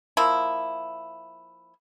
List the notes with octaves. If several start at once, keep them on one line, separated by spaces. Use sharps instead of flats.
F3 A#3 E4